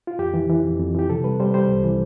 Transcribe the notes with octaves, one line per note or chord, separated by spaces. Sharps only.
F4
F2 G4
E3
E3
F2
F2
E3 G4
C3 A4
G3 B4
G3 C5
G3 C5
C2
E3